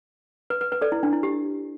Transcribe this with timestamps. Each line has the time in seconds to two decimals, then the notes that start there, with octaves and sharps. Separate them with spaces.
0.50 B4
0.61 B4
0.72 B4
0.81 A4 D5
0.92 E4
1.03 D4
1.13 E4
1.23 G4